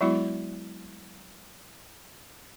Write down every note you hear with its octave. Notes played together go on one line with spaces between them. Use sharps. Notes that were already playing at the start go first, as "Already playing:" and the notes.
F#3 G#3 B3 E4 F#4